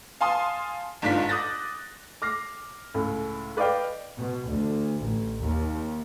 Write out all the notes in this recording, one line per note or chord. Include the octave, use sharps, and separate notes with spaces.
F5 G#5 A5 C6 D#6
G1 G#2 D4 F4 B6
D6 D#6 F#6 G6 A6 A#6
D6 F6 A#6 C7
C#2 A2
B4 D5 D#5 F5 G5
B2
D2
A1
D#2